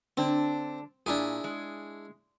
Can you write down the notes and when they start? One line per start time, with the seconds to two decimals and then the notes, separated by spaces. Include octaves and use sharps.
0.17 D3 C4 D4
1.06 A#2 D4 E4 G#4
1.44 G#3